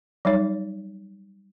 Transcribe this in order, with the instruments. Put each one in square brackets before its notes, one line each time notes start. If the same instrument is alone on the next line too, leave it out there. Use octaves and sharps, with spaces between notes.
[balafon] F#3 G3 D#4 C#5